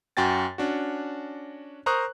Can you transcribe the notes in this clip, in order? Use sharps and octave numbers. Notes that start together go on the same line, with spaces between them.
F#2 F#4 G5 G#5 A6
C#4 D4 F#4
A#4 C5 A#5 C#6 D#6 F#6